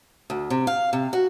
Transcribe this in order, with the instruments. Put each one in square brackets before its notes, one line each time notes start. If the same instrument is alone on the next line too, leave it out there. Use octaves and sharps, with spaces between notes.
[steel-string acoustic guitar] D2
C3
F5
C3
F#4